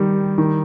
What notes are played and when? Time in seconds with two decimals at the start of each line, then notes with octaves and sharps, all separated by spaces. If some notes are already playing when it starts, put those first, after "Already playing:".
Already playing: D#3 G3
0.38 D#3